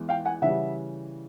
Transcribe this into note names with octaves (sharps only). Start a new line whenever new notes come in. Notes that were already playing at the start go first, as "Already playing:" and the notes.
Already playing: E2 E3 G#3
F5 G5
F#5 G#5
C#3 E3 G3 E5 F#5